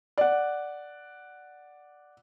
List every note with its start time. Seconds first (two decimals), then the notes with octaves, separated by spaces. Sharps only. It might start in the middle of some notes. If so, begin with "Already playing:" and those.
0.18 D5 F#5